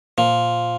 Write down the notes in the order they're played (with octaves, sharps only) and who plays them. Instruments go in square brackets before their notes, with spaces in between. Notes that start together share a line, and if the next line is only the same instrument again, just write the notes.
[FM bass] A#2 [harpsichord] F3